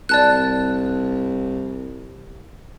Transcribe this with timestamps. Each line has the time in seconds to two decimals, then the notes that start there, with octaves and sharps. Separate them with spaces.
0.09 C2 D5 A5 F#6